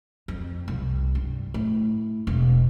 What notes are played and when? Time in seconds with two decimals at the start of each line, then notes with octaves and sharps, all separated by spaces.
0.28 F2
0.68 C2
1.15 G2
1.54 A2
2.27 E1